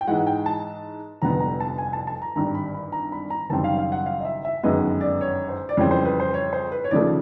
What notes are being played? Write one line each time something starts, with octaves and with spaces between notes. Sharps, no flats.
G5
G#2 E3 G#3 F#5
G5
A5
F1 F2 D3 G3 B3 A#5
A#5
A5
G#5
A5
A5
A#5
G#1 G2 D3 G3 A#5
B5
B5
A#5
B5
A#5
F#1 F#2 D#3 G3 C4 A5
F5
F5
F#5
F5
D#5
E5
E5
G1 F#2 D#3 G#3 B3 D#5
D5
C#5
C5
D5
F2 C#3 E3 G3 C4 C#5
C5
B4
C5
C#5
C5
B4
C#5
D#2 C#3 F3 A3 D5